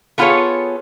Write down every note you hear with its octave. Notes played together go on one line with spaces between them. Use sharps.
A3 B3 F4 G#4 A4 C#5